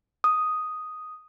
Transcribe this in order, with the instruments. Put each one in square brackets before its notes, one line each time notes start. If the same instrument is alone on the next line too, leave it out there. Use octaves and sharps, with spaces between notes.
[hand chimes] D#6